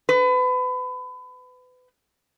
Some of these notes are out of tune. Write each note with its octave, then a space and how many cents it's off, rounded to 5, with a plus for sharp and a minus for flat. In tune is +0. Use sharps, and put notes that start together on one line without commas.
B4 +30